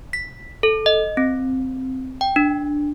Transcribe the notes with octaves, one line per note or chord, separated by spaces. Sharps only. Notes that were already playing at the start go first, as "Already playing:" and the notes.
B6
A4
D#5
C4
G5
D4